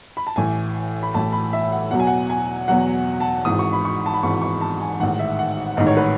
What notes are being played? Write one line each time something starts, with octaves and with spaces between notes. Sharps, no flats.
B5
A5
A1 A2 E3 G#5
B5
A1 A2 E3 A5
B5
E5
F#5
E2 B2 F#3 F#5
G#5
F#5
G#5
E2 B2 F#3 F#5
A5
G#1 G#2 E3 D#6
C#6
B5
C#6
A5
B5
G#1 G#2 E3 C#6
C#6
A5
G#5
A1 G#2 D#3 F#5
E5
F#5
A1 G#2 D#3 D#5
C#5
B4